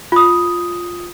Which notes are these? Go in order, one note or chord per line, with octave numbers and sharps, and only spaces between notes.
F4 D#6